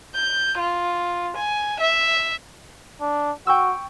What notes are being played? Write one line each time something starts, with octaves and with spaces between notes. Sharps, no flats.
G6
F4
G#5
E5
D4
F#4 G5 C#6 E6